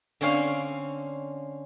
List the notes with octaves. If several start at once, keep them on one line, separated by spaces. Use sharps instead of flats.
D3 C4 C#4 C#5 F5